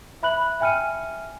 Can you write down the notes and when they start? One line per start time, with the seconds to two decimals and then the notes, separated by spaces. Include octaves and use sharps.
0.23 E5 B5 F#6 F#7
0.60 E5 G5 G#5 F6 C#7 D#7